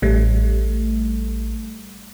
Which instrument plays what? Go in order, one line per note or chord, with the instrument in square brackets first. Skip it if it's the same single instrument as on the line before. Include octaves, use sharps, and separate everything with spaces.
[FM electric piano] A1 G3 A3